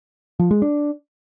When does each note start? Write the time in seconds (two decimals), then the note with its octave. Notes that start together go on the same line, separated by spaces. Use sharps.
0.39 F3
0.51 G#3
0.62 D4